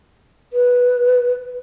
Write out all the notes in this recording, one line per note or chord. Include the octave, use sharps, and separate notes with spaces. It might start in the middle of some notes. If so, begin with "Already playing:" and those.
B4